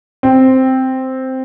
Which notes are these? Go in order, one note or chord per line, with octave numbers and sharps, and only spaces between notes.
C4